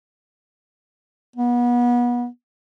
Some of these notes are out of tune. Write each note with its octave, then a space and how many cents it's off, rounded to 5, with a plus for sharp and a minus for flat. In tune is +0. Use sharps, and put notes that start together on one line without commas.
B3 -30